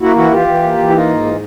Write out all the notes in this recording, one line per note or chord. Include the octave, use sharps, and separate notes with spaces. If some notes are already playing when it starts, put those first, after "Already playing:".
A#3 E4 F#4
E3 E4 F#4
E3 F4 G4
E3
A#3
E3
E4
A#3 D#4 F4
G#2
E3